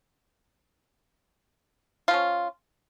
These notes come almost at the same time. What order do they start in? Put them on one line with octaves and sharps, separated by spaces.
F4 F3 C#4